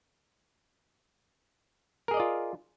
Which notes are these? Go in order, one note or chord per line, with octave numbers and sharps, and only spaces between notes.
F4 G#4 A#4 D5 D#5